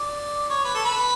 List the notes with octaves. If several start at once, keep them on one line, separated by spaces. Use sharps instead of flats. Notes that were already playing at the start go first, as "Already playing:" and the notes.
Already playing: D5
C#5
B4
A4
B4